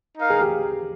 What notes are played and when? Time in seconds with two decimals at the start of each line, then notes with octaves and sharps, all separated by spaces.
0.18 D#4 A#4 F5
0.30 G#4
0.41 G4